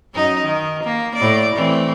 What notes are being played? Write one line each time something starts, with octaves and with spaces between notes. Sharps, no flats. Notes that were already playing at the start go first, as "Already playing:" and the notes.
F#2 D#4
D#3
A#3
A2 D5
E3 A3 C4